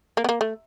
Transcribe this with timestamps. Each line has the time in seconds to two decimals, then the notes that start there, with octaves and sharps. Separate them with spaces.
0.17 A#3
0.24 B3
0.29 A#3
0.41 A3